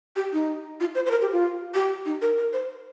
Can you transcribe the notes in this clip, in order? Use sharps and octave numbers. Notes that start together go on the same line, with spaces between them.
G4
D#4
F4
C5
C5
A#4
G4
F4
G4
D#4
A#4
A#4
C5